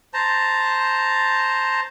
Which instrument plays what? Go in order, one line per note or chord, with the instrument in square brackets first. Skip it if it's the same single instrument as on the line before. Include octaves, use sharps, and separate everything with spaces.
[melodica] C5 A5 A#5